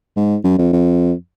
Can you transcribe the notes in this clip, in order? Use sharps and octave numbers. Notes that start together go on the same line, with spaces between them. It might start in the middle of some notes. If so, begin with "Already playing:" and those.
G#2
F#2
F2
F2